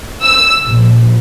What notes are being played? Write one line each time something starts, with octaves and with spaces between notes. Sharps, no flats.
E6
A#1